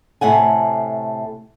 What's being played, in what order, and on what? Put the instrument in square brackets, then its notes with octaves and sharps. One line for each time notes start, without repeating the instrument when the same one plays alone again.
[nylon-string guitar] A2 C3 A3 F#5 G#5